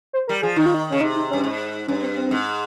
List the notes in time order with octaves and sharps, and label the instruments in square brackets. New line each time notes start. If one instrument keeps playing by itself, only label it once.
[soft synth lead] C5
[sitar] G3 [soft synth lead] A#4
[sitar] F3 [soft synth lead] G#4
[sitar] D#3 [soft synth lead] D#4
[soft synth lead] F4
D#4
[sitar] C#3 [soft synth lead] C#4
[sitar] C3 [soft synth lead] D#4
[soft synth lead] D#4
[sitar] G2 [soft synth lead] C#4
[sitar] G#2
[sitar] G2 [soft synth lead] C#4
[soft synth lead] C4
C4
[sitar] G#2